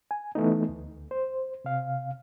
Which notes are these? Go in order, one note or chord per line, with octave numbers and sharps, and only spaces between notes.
G#5
E3 A3 B3 D#4
D2
C5
C3 F5